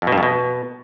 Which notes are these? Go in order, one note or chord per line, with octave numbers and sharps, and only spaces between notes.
F2
B2
G2
F2
B2